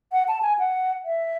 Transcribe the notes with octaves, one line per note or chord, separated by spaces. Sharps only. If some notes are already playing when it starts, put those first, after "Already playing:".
F#5
A5
G#5
F#5
E5